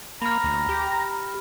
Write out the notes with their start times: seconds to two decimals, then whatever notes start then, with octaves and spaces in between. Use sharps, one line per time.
0.22 A#3 A#5 B5 F6
0.44 D2
0.69 G4